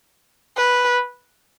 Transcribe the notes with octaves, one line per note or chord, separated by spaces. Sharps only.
B4